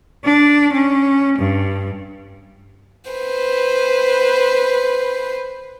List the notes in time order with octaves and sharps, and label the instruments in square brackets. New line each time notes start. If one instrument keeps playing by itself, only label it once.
[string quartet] D4
C#4
G2
[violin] B4 C5